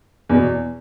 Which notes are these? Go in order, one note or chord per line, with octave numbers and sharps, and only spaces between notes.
E2 B2